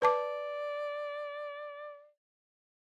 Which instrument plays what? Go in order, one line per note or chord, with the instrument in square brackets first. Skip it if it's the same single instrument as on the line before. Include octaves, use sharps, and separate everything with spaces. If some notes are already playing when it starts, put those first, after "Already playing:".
[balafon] B4 A5 D6 [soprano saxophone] D5